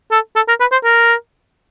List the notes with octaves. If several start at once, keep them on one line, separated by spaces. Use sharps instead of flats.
A4
A4
A#4
B4
C5
A#4